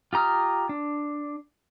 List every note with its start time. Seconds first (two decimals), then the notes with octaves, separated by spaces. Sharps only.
0.13 F4 G4 A#5 D#6 F6
0.69 D4